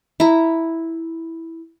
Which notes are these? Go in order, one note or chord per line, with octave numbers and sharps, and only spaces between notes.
E4 A#5